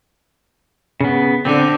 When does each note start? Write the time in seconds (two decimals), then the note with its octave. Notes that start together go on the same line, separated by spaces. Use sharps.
1.01 C#3 B3
1.45 D3 C4